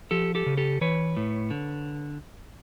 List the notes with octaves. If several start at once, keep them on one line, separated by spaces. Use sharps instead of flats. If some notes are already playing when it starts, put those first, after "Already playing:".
F3 G4 A4
G4 A4
C#3
G4 A4
E3 B4 C#5
A2
D3